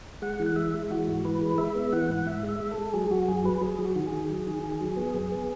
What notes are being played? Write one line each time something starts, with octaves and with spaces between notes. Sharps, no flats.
G#3 F#5
E3
F#5
G#3 E5
G#3
E3 F#4
G#2
E3 B4
G#3
G#3 E5
B3
E3 F#5
G#2
G#2 E5
G#3
E5
G#3
A4
G#3
F#3 G#4
F#3 F#4
F#2 G#4
F#3 B4
F#3 G#4
F#3
F#4
D#3 F#4
G#4
D#3
F#3
D#3
D#3
F#3
B3
F#2
B3